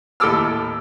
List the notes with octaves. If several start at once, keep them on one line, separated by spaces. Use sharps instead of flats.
D#2 A2 A4 D6 E6 F6